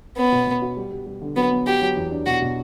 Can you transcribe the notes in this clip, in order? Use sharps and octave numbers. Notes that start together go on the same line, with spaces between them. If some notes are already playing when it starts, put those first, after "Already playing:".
B3 C#4
B2
B2
F#4
G3
G3
G3
D3
F#3 B3
B3
F#4 G4
F#3
E2
D4
B2 F#4
B2